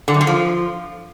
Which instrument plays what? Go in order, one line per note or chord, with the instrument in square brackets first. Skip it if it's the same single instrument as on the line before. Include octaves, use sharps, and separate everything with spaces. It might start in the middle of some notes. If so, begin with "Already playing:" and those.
[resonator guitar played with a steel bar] D3
F#2
D3
F3